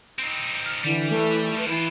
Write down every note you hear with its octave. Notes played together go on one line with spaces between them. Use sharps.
C4 D#4
F6
D3 E3 G3
A3
F3 G3 B4
E3 E4 F4